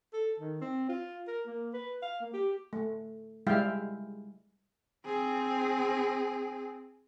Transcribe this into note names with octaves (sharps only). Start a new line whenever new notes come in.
A4
D#3
C4
F4
A#4
A#3
B4
F5
A#3
G4
A3
G3 G#3 E4 E5 F5 G5
C4 G#4